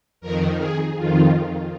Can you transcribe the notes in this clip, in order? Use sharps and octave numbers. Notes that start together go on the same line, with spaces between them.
F2 D#3 A#4
G#4
F2 D#3 F4